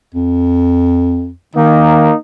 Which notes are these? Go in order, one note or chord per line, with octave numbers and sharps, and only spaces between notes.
F2
D#3 A#3 D#4